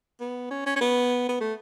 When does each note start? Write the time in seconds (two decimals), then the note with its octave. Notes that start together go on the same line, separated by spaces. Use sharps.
0.20 B3
0.50 C#4
0.66 C#4
0.76 C#4
0.80 B3
1.29 B3
1.40 A3